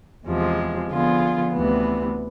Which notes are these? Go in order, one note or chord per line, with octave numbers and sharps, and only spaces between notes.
E2 C3 F3 G#3
D3 F3 B3 F4 G#4
D2 C3 E3 B3